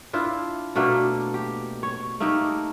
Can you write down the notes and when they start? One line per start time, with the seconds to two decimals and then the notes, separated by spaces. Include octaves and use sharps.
0.13 D4 E4 F4
0.76 B2 A3 A#3 D4
1.34 G4
1.83 C#5
2.20 A3 A#3 D#4 G4